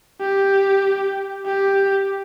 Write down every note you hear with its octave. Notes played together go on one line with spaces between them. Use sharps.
G4
G4